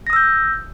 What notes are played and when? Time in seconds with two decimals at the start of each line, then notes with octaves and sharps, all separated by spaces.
0.07 A#6
0.10 D#6
0.13 E6
0.16 G6